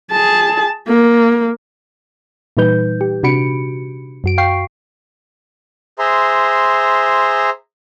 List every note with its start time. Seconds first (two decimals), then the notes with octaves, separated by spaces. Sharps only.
0.11 G#4 A5
0.88 A#3
2.57 A#2 E3 G3 D#4 B4 G6
3.01 G4
3.23 C3 D4 F#4 B5 C#7 D7
4.24 F#2 F#4 D7
4.38 F5 G5 C#6 C7
5.99 G#4 C5 E5 A#5 C6